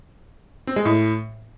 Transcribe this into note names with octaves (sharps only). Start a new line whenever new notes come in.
C4
G#3
A2